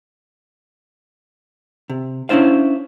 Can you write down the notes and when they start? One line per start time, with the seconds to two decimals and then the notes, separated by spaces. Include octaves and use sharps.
1.90 C3
2.29 C#4 D4 E4 C5 F5